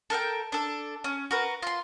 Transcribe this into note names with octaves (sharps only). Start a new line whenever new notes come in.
A4 A#4 F5 G5
D4 A4
C#4
F#4 A#4 B4
F4 C6